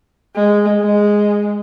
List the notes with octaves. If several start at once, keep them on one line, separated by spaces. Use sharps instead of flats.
G#3
G#3